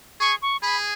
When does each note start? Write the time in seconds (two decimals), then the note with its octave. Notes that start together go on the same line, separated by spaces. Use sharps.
0.20 G#4 C#6
0.42 C#6
0.62 G#4 B5